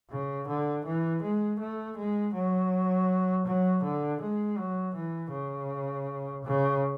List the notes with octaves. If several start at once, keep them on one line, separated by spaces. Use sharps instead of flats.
C#3
D3
E3
G#3
A3
G#3
F#3
F#3
D3
G#3
F#3
E3
C#3
C#3